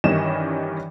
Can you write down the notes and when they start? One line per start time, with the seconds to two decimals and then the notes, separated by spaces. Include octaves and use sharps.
0.04 G2 D#3 E3 C#4 D#5 E7